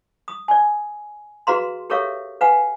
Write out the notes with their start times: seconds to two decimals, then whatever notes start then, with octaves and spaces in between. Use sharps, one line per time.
0.28 D#6
0.48 D5 G#5
1.47 F#4 G#4 B4 F5 A#5 C6
1.90 G4 A4 A#4 C#5 E5 F5
2.41 B4 F5 F#5 G#5